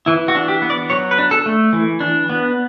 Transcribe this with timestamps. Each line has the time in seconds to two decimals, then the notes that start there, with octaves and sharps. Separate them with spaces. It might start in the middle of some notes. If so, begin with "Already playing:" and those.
0.06 E3 E4
0.28 F#4
0.35 D4
0.48 G4
0.62 B3
0.70 D5
0.90 F#3 C#5
1.11 B4
1.18 D4
1.31 A4
1.46 A3
1.73 E3
2.00 D4
2.29 B3